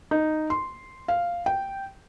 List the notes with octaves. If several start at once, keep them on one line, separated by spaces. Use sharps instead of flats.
D#4
C6
F5
G5